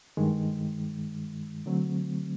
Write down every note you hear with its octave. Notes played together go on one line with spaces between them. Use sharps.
G2 D#3 G#3
D3 F#3 A3 C4